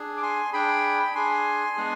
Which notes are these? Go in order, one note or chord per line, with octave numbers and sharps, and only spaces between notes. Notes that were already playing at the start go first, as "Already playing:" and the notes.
Already playing: D4 G#4
D6
G#5 C6
D4 G#4 G5 B5
B5
D4 G#4 G#5 C6
G#3 B3 D4 G#4